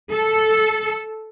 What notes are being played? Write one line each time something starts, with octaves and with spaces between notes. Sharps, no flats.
A4